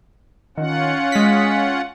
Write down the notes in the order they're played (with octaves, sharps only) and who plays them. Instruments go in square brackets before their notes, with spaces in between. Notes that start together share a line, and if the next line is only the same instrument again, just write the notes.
[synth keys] D#3 [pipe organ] C#4 F4 F#5
[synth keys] G#3 B6